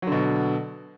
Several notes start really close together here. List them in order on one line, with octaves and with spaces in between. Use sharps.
F#3 D3 B2